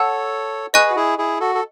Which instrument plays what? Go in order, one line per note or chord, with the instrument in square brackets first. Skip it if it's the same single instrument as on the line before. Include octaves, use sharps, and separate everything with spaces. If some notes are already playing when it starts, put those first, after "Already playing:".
Already playing: [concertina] A4 C#5 [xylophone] F#5 A5 E6
[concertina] G#4 B4 [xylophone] D#5 G#5 C#6 F#6
[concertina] F#4
E4 G#4
E4 G#4
F#4 A4
A4